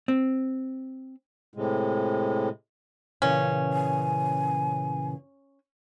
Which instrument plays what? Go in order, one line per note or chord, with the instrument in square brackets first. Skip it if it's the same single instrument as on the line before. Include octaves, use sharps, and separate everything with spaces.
[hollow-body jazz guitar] C4
[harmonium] A2 C3 G#3
[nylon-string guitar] A#2 C#3 E3 [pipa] C#4
[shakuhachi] G#5